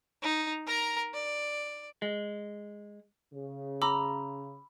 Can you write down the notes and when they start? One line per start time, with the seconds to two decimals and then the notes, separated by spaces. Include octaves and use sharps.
0.22 D#4
0.67 A#4 A#5
1.13 D5
2.02 G#3
3.34 C#3
3.82 A#5 B5 D6 E6